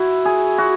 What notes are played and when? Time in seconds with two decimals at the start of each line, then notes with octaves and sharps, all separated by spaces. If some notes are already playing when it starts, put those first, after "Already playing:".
Already playing: E4 F#4
0.25 G#4
0.58 F#4